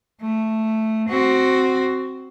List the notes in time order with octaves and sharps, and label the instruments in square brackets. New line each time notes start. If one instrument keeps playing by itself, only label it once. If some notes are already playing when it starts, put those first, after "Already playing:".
[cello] A3
C4 F#4